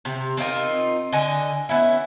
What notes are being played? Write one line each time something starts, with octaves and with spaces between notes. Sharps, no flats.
C3
C4 D#4 F4 A#4
D3 D#5 G#5
B3 C#4 E4